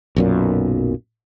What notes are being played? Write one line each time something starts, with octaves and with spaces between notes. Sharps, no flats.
B1 F#2 A#2